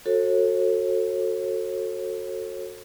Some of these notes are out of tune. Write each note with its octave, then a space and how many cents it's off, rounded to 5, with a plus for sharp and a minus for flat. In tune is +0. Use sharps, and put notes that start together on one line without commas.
F#4 -10 A4 +20 C#5 -40